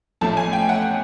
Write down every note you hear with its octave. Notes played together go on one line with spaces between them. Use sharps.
A1 A2 F3 A3 A5
G#5
G5
F#5